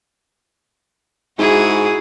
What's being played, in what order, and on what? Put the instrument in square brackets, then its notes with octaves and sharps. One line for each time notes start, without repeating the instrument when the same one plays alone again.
[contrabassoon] G#2 [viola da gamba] E4 F#4 G#4